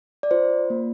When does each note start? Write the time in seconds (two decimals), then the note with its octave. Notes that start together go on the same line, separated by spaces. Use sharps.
0.23 D5
0.31 F4 C5
0.70 A#3